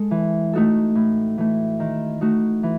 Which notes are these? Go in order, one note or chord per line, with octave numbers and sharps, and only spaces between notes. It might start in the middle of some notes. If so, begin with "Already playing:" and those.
Already playing: G#3 A4
E3
A3 D#4 F#4 A4
A2
E3 A3
D#3
A3 D#4 F#4
E3